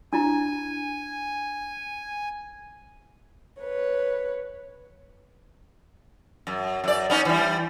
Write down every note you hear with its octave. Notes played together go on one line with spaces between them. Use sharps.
D4 E4 G#5 A#5
B4 C#5
F#2
F#2 D5
B3 C#4 D#4
E3 G3